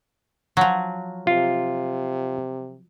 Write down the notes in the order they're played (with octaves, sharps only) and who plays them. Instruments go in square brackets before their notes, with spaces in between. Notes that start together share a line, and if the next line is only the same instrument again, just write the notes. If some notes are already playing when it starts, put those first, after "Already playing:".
[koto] F3 F#3
[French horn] C3 [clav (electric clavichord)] F4